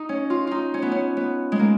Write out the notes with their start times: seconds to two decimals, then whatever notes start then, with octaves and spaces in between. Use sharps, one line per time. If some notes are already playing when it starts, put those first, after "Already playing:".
Already playing: D#4
0.09 C#4
0.30 F4
0.47 D#4 F4
0.74 C#4
0.82 B3
0.92 C#4
1.17 B3
1.52 G#3
1.59 A#3